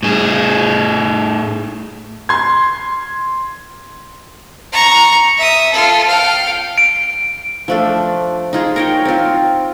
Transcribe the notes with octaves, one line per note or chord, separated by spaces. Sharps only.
A2 G#4
C6 G#6
A#5 C#6
E5 D#6
F4 A4
F5 G5
D7
F3 A3 D4
D#4 F4 G#4
A#4 C#5 G5
C4 F4